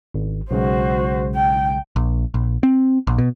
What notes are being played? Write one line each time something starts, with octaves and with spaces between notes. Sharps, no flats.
G#1
B1 C#3 G#3 F#4 C5
G5
A#1
A#1
C4
A#1
B2